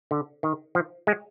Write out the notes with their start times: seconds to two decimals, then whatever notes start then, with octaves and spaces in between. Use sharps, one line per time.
0.11 D3
0.43 D#3
0.75 F3
1.07 G#3